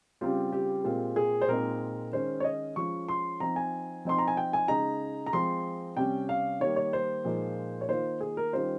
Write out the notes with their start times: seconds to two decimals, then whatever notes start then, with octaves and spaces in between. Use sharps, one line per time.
0.21 C#3 G3 C4 F4 G4
0.52 G4
0.84 A#2 G#3 C4 F4
1.16 G#4
1.41 C5
1.48 A#2 G#3 C4 D#4 A#4
2.13 D#3 G#3 C#4 C5
2.40 C#5
2.44 D#5
2.76 F3 G#3 C#4 F4 C#6
3.09 C6
3.40 F3 C4 D#4 A#5
3.56 G#5
4.05 F3 C4 D#4 C6
4.18 A#5
4.28 G#5
4.37 G5
4.53 G#5
4.68 C#3 G#3 D#4 A#5
5.27 A#5
5.33 F3 G#3 C4 C6
5.97 C3 G3 C#4 G5
6.29 F5
6.60 D#3 G3 A#3 C#5
6.76 C#5
6.93 C5
7.25 A#2 F3 G#3 D#4
7.81 C#5
7.88 D#3 A#3 F4 C5
8.21 G#4
8.37 A#4
8.53 D#3 G3 C#4 F4 C5